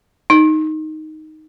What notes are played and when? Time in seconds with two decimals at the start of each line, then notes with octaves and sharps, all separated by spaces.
0.30 D#4